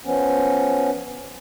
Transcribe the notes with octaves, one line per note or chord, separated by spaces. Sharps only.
F3 B3 C#4